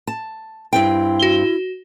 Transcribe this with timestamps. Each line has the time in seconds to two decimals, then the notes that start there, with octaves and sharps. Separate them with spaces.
0.07 A5
0.73 G2 C4 E4 G5
1.19 F#4 G7